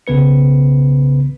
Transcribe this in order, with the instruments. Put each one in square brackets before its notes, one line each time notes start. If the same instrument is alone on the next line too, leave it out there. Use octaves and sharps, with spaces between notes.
[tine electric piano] B1 C#3 B3 B4 C#7